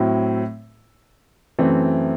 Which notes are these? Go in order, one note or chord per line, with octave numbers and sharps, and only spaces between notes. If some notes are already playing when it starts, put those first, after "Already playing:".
Already playing: A2 F#3 C4 E4
F#2 E3 A3 C4